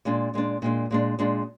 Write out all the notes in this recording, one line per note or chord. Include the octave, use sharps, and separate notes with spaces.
A#2 G#3 D4
A#2 G#3 D4
A#2 G#3 D4
A#2 G#3 D4
A#2 G#3 D4